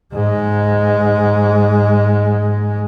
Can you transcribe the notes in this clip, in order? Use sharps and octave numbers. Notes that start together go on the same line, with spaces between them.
G#2 G#3